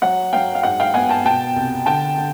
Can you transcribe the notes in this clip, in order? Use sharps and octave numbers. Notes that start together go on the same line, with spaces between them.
F#3 F#5
F#3 F5 G5
F5
G#2 F#5
F5 G5
B3 F#5 G#5
G5 A5
B2 G5 A5
C2
D3 G5 A5
D3